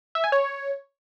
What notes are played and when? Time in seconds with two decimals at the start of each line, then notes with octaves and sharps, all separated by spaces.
0.15 E5
0.24 G#5
0.32 C#5